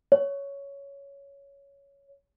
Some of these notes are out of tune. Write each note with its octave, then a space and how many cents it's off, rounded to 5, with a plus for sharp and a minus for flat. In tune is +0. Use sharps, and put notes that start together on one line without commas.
C#5 +10